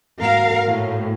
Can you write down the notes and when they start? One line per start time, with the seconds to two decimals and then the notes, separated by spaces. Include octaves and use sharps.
0.21 G#2 A#3 F#4 A#4 F5
0.68 A2